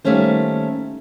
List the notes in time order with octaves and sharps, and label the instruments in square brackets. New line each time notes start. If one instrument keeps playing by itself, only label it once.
[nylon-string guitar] D#3 G3 A3 A#3 C#4 C5